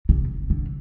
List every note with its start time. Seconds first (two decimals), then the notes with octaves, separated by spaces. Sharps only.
0.09 C3
0.50 D3